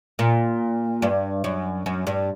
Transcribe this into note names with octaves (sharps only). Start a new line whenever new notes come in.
A#2
G2
F#2
F#2
G2